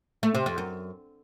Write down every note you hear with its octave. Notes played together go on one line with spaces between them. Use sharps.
A3
C3
F2
F#2